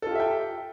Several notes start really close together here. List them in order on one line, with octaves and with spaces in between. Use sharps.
A4 F4 G4 E5 G5